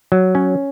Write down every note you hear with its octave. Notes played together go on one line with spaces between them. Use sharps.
F#3
C#4